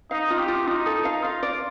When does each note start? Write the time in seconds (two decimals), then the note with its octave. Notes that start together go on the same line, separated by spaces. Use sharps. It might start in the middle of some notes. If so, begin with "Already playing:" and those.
0.11 D#4 F5
0.30 F4
0.39 G4
0.48 F4
0.67 D#4 F4
0.86 A4
1.05 F5
1.23 F4 F5
1.43 D5